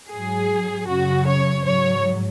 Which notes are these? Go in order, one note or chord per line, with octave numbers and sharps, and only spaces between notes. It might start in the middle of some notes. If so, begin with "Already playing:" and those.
G#2 F#3 G#4
F#2 C#3 F#3 F#4
C#5
G#2 F#3 C#5